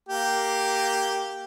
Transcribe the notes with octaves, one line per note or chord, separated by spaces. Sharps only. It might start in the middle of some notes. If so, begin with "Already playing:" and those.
A#3 G4